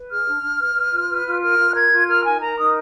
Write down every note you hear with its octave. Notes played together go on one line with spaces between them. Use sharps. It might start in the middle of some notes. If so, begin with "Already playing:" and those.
Already playing: B4
G#4 F6
D4
D4
B4
B4
F4
B4
F4
A#4 F6
F4
F#6
A#4 G#6
F4
A#4 F6
D#4 G#5
A#4 A#5
D#4 D#6